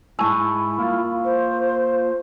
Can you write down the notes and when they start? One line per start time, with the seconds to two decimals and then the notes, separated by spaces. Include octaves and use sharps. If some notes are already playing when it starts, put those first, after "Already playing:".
0.19 G#2 G#3 E4 G#5 A5 C#6 E6
0.78 A#3 F4
1.25 C5